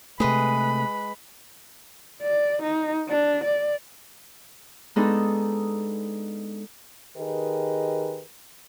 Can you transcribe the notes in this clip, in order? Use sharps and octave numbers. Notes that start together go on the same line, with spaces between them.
C3 G#3 A3 B4 B5
D5
D#4
D4
D5
G#3 B3 D4 D#4 G#4 A4
D#3 G4 G#4 A#4 B4 D#5